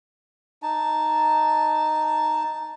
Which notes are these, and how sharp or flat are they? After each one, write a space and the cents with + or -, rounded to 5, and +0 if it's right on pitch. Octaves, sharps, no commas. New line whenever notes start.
D#4 -5 A5 +0